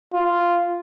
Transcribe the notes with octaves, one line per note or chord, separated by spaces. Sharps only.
F4